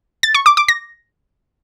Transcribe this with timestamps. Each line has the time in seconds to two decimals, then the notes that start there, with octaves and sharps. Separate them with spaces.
0.23 A6
0.34 C#6
0.46 D6
0.57 D6
0.68 A#6